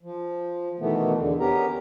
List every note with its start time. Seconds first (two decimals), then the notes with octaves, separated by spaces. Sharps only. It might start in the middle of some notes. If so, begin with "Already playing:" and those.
0.03 F3
0.80 B2 D#3 E3 A3 B3
1.18 E2 D3
1.40 B3 C#4 G4 A#4 A#5